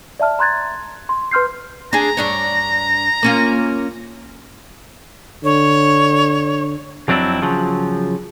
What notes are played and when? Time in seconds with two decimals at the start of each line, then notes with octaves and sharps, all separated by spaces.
0.20 D5 E5 A5 F6
0.39 A#5 C6 F#6 G#6 A6
1.09 C6
1.31 B4 C6 F6 G6 C7
1.93 D4 G#4 A#5
2.17 G2 D4 C#5
3.23 A#3 C#4 F4
5.44 D3 C#5
7.08 F2 F#3 C4 D4 E4
7.42 C#3 F3 F#3